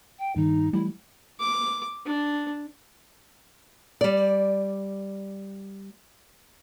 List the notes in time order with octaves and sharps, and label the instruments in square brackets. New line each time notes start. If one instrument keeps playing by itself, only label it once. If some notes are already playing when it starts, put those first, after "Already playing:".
[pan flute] G5
[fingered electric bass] G2 D#3 [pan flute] D#4
[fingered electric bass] E3 G3 A3 [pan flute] E4
[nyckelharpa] D6
D4
[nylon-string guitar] G3 D5